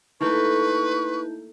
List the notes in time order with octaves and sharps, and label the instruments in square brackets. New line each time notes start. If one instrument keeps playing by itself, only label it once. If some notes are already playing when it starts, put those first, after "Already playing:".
[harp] A3 A#3 [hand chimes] D#4 E4 G6 [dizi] B4 [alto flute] C#6